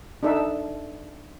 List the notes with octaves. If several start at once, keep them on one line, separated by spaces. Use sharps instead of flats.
D4 D#4 A4 E5